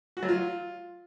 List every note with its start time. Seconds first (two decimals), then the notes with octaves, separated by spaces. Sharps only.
0.17 F#4
0.23 F#3
0.29 F4